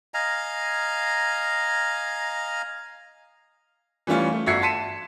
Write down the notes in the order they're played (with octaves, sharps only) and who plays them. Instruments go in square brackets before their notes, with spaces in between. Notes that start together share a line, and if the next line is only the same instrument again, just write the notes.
[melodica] D#5 F5 G#5 A#5
[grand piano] E3 G3 A3 C#4 F4
A3
G1 F#4 E5 G#6 C7 C#7
A5 C6 B6 C#7 D#7 E7